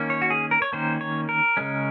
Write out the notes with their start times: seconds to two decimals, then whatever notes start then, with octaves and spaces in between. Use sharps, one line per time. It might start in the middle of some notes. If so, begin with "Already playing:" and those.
Already playing: D#3 A#3 C#4
0.10 C#5
0.22 F#4
0.30 G#4
0.51 A#4
0.62 C#5
0.73 D#3 A#3 C#4 C5
1.01 C#5
1.29 A#4
1.57 C#3 G#3 C#4